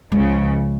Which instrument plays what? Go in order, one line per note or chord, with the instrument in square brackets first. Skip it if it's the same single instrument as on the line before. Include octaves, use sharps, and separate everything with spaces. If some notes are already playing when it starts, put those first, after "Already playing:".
[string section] C#2 C#3 F3 [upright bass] G#3